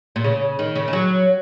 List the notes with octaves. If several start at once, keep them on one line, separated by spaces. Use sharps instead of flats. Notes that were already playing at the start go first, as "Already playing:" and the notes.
A#2
C#3
D#3
C#3
D#3
F#3